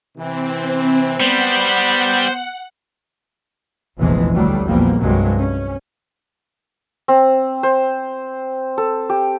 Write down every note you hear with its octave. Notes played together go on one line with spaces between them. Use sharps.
C3 E3 C4
G3 B3 C5 F#5
F1 A#1 E2 C3 E3 G#3
D2 F#3 G3 A3
A#1 E2 F3 G3 A#3
C2 G2 F#3 G#3
C#4
C4
C5
A4
G4